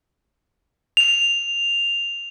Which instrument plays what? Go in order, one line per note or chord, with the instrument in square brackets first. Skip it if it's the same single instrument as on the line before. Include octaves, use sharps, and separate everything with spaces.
[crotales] F7